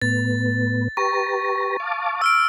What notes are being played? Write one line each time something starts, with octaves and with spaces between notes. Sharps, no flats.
A2 B3 A6
G4 B4 A#5 C#6
F5 A5 D6
E6 F6 D7